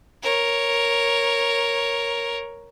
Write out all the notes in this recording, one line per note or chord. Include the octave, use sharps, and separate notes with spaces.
A#4 C#5